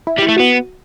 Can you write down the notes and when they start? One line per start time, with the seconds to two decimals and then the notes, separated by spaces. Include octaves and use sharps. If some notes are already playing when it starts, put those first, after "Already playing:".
0.07 E4
0.19 G3
0.22 E4
0.29 A3
0.37 B3 F#4